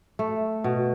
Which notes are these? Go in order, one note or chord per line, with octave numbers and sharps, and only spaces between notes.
A3
B2